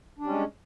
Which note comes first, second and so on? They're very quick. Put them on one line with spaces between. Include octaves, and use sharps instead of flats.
D4 G3 C#4 G#3